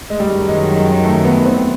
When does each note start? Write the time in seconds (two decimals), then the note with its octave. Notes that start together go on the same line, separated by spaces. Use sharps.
0.10 G#3
0.20 F#2 D#3 F#3 G3
0.48 G#3
1.04 A3
1.24 B3
1.45 C4